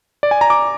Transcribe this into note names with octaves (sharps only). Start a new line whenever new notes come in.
D5
G#5
A#5
D6